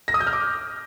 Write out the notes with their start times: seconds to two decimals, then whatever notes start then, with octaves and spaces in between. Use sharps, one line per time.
0.08 A#6
0.14 D#6
0.20 G6
0.27 F6
0.33 D6